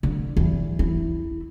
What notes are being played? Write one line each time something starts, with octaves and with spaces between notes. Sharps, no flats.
D3
E2
E4